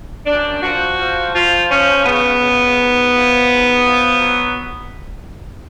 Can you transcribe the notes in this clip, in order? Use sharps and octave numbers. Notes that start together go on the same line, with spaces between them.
F#2 D4
F3 F#4
F3
F3 F4
F3 C#4
C#3 B3
C#3
G#2
F3
G#2
F3
F#3